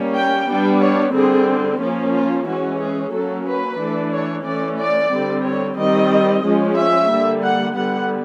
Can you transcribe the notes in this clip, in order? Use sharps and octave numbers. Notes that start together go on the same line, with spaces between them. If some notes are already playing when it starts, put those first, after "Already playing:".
Already playing: G3 A#3 C#4
G5
G3 B3 D4
C#5
D3 G3 C4 G#4
F3 A#3 C#4
F4
E3 G#3 C#4 F#4
G#4
F#3 A#3 C#4 A4
B4
E3 A3 D4
C#5
E3 A3 C#4 D5
D5
D3 G3 C4
C#5
D#3 G3 C4 D#5
F3 G#3 C#4
E5
D3 G3 A#3
F#5
D3 G3 B3 F#5